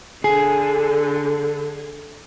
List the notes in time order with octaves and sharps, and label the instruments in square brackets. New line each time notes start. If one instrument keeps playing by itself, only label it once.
[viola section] D3 [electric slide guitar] G#4